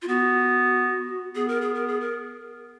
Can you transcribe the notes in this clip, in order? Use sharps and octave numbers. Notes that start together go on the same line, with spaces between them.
F4
B3 F#4
B3 G#4
A#4
G#4
A#4
G#4
A#4